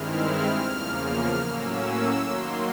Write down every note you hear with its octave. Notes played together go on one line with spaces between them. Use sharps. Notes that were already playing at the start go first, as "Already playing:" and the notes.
Already playing: G2 D#3 G#3 C4 E4 F6
E2 C#3 F3 A#3
F6
A2 F#3 A#3 C#4 E6
D#3 F#3 A#3 C6